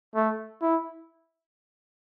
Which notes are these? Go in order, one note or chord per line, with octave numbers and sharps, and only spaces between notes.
A3
E4